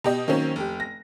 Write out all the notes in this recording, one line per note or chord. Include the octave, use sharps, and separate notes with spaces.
B2 G4 D#5
D#3 F#3 A#3 C4 C#4
F1 G4
A#6